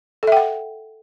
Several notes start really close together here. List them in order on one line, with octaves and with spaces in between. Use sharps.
A4 E5 G5 F#5